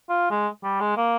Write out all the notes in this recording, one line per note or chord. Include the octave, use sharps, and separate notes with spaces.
F4
G#3
G3
G#3
A#3